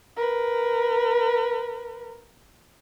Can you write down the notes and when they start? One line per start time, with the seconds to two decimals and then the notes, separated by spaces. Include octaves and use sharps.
0.16 A#4 B4